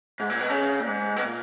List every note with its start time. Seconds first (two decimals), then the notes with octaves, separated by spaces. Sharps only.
0.20 G#2
0.30 A#2
0.40 B2
0.49 C#3
0.80 A#2
0.87 G#2
1.16 B2
1.24 A#2